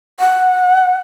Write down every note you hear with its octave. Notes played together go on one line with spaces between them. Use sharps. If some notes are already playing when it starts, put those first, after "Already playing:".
F#5